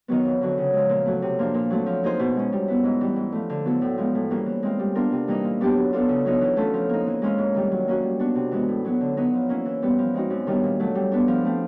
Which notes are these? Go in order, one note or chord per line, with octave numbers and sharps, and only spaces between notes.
D#3 F#3 B3
F2
D3 F#3
C#3
F3 G#3
A#2
F#3 A3
C3
F3 A#3 D4
A#2
F#3 A3 C4
F3
A#3 D#4 G#4 C5
B2
G#3 C#4
G3
B3 E4
G#2
E3 G3
G#2
F3 A3
D3
F#3 B3 E4 A4
A2
F3 G#3 B3
A2
E3 G3 A#3 C#4
E3
G#3 C4 F4
G3
B3 D4 F4 A#4
C3
E3 G3 A#3 D#4
A#2
F#3 B3 D4 G4
F#3
B3 D4 F4 A4
C#3
F#3 B3 D#4
E3
A3 C#4 F4 A4
F3
A#3 D#4
E3
G#3 C#4 F4
G#2
D#3 G3
F#3
A#3 C#4 F#4
G3
B3 D4 F#4
C3
E3 G#3 B3
A2
F#3 B3
D3
F#3 B3 D#4
F3
A#3 C#4 E4
E3
G3 B3
F3
G#3 C4 D#4 F#4
F#2
D#3 G3 B3 D4
A#2
F#3 A3
G3
B3 D4
F3
A3 C4